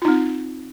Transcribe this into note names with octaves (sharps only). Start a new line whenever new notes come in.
C4 D#4 F4